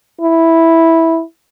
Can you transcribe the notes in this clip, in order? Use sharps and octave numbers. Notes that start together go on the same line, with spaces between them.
E4